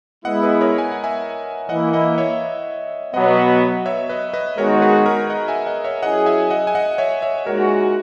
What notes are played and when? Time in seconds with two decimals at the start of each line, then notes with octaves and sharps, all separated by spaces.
0.25 G#3 B3 E4 D#5 F#5
0.43 B4 D#5
0.61 A#4 C#5
0.78 G#5
0.92 F#5
1.04 E5 G#5
1.69 E3 A#3 E4 D#5 F#5
1.93 D#5 F#5
2.18 C#5 E5
3.14 B2 F#3 B3 D#5 F#5
3.86 C#5 E5
4.09 B4 D#5
4.33 B4 D#5
4.58 D#3 G#3 B3 D#4 F#4 A#4 C#5
4.76 C#5
4.82 G#4 B4
5.06 A#4
5.30 D#5 F#5
5.48 E5 G#5
5.66 D#5 F#5
5.84 C#5 E5
6.02 F#3 C#4 E4 G#4 D#5 F#5
6.26 E5 G#5
6.50 D#5 F#5
6.67 G#5
6.75 D#5 F#5
6.98 C#5 E5
7.22 C#5 E5
7.46 A#2 G#3 D#4 F#4 A#4 C#5